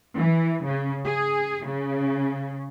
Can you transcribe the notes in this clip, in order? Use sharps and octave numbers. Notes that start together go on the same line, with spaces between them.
E3
C#3
G#4
C#3